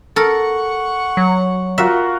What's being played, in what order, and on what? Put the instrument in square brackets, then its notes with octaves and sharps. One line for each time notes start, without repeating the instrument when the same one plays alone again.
[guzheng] A4 A#4 [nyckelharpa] F#5 C#6
[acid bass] F#3
[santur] F4 F#4 A#4 [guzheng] E5